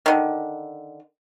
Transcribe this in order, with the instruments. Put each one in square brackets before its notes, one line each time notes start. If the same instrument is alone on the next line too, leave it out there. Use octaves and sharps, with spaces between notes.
[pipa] D3 D#3